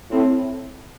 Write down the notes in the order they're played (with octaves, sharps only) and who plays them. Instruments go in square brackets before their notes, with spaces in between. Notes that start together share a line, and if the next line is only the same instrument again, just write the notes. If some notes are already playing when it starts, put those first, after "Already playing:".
[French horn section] A2 [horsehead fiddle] C4